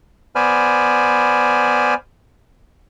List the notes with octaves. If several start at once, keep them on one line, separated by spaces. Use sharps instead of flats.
B3 C5 D5 G#5 B5 F6